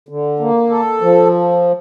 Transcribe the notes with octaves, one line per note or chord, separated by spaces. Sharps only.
D3
A#3
A4
F3